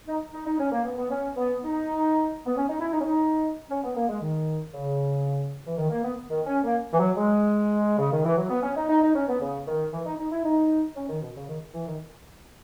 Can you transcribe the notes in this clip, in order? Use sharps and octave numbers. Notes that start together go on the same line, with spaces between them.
D#4
D#4
D#4
C#4
A#3
B3
B3
C#4
B3
D#4
B3
C#4
D#4
E4
D#4
C#4
D#4
C#4
B3
A#3
G#3
D#3
C#3
E3
D#3
A#3
B3
D#3
C#4
A#3
E3
F#3
G#3
C#3
D#3
E3
F#3
B3
C#4
D#4
D#4
D#4
C#4
B3
C#3
D#3
E3
D#4
D#4
E4
D#4
C#4
D#3
B2
C#3
D#3
E3
D#3